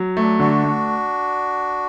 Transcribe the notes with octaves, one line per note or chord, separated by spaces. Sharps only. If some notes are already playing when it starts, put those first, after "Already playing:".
Already playing: F#3
A3
D4
D3 D4 F#4
A3